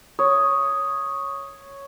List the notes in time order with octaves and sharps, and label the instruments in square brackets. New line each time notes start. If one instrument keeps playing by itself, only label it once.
[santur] C#5 [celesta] D#6